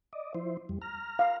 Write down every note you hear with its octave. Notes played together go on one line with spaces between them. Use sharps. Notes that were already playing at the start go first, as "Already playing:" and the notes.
D5 D#5
F3 E4 C5
F2 G3
A#5 F6
F5